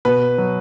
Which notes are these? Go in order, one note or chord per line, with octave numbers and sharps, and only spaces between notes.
B2 B4
F#3